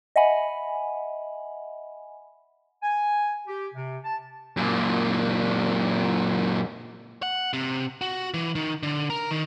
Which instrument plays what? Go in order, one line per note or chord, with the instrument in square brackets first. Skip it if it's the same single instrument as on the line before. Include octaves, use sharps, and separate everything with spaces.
[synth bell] D#5 E5 F#5 G#5 B5
[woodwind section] G#5
G4
C3
A5
[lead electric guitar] F#2 A#2
F#5
C3
F#4
E3
D#3
D3
A#4
D#3